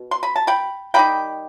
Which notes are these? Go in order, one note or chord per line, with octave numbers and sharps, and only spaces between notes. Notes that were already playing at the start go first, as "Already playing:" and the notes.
Already playing: B2
C6
B5
A5
G5 B5
D#3 G3 D#4 G5 B5